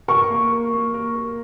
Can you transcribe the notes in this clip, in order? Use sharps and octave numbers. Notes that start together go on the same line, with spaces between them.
A#4 C#6
A#3
A#4
A#3
A#4
A#4